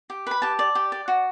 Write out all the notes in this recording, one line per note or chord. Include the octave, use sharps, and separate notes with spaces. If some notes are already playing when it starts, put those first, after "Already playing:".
G4
B4 B5
G4 A5
D5
G4
D5
F#4